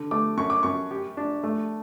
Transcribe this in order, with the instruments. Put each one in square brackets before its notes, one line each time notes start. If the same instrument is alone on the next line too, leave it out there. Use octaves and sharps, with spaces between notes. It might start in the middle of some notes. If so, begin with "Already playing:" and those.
Already playing: [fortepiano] D3
[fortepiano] A3 [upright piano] D6
[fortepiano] F#2 [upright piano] C#6
[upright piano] D6
[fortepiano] F#2 [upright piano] C#6
[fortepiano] G4
D4
A3